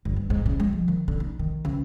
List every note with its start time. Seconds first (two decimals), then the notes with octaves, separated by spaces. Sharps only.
0.05 G1
0.16 E2
0.30 G#2
0.46 C#3
0.60 G#3
0.73 F3
0.88 D#3
1.08 D3
1.20 D#4
1.39 D#3
1.65 C#2